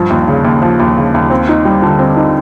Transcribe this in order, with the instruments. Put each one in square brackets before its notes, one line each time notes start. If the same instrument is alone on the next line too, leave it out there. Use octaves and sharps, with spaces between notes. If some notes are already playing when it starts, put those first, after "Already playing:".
Already playing: [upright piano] G2 F3
D#2
C#3
D#2
F3
D#2
C#3
D#2
C4
D#4
G3
D3
C4
D#4